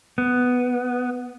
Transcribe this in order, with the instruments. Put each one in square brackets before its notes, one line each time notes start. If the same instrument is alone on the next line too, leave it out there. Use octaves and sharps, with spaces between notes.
[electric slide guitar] B3